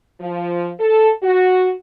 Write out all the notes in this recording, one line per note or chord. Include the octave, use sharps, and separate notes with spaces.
F3
A4
F#4